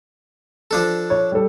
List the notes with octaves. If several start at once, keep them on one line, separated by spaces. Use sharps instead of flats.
F3 D4 A4
C#5
G3 A4